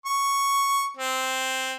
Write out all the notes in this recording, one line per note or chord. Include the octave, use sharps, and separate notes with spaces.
C#6
C4